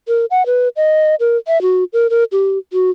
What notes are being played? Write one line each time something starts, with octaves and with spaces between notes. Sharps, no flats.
A#4
F#5
B4
D#5
A#4
E5
F#4
A#4
A#4
G4
F#4